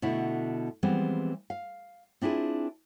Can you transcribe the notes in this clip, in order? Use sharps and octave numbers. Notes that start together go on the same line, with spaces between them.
B2 D3 A3 E4
E3 F3 G3 G#3 B3 C4
F5
C4 D4 E4 F4 G#4